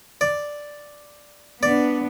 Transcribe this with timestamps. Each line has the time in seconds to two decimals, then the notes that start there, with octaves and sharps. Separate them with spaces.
0.21 D5
1.63 B3 D4 D5